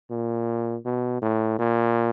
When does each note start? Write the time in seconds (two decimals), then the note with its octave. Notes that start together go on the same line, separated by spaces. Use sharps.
0.11 A#2
0.85 B2
1.22 A2
1.59 A#2